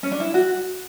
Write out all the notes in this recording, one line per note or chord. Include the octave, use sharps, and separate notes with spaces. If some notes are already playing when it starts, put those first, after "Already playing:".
C#4
D4
E4
F#4